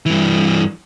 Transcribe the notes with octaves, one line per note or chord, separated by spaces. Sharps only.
G2 E3